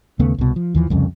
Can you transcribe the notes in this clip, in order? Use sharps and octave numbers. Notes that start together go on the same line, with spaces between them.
D#2 C#3 A3 B3
C2 B2
F3
D#2 E3 F3
C2 F2 C#3